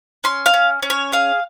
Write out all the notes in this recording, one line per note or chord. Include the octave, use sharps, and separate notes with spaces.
C#4 C6
F5
C#4
C#4
C#5
G#4 F5